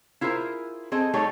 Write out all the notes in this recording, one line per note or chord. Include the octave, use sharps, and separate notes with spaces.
E4 F4 G#4 A#4 C5
C4 G#4 A4 D#5
G3 A3 D#4 G4 G#4 C#5